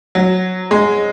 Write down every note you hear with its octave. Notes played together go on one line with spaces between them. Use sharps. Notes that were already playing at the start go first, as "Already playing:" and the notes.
F#3
G#3